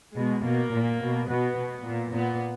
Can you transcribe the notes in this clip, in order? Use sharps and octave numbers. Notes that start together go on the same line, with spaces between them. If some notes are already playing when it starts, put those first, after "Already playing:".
B2 G#3
B2 A#3
A#2
B2
B2 B3
B2
A#2
A#2 B3